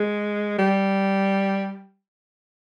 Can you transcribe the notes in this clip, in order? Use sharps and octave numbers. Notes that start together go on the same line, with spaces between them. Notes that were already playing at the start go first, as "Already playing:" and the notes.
Already playing: G#3
G3